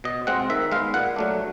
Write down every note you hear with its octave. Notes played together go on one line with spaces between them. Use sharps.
B2 D#5
G#3 C4 F4 F#5
D#3 E5
G#3 B3 F5
A#2 F#5
F#3 A3 D4